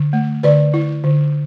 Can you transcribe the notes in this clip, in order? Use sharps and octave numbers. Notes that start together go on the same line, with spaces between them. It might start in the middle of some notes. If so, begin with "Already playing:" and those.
Already playing: D3
A3
D3 B4 D5
E4
D3